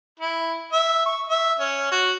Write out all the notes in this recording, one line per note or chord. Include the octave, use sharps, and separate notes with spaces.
E4
E5
C#6
E5
C#4
F#4